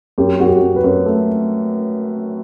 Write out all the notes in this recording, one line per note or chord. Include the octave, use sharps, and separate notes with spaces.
F#2 G4
F#2 F#4
G4
F#2
B4
F#2
A3